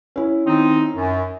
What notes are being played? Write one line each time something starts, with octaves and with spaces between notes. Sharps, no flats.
C#4 E4
D#3 C4 D#4
F#2